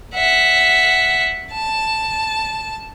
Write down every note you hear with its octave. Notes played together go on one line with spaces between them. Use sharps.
E5 F#5
A5